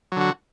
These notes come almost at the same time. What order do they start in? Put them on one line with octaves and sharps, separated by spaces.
F#3 D3 F#4